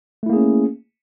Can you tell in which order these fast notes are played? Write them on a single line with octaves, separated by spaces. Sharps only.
A3 E4 A#3 G#4 C#4